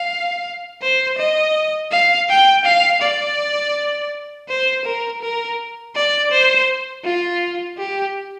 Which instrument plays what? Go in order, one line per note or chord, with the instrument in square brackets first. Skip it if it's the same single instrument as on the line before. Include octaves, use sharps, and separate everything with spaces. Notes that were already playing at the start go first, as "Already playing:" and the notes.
Already playing: [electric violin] F5
C5
D#5
F5
G5
F5
D5
C5
A#4
A#4
D5
C5
F4
G4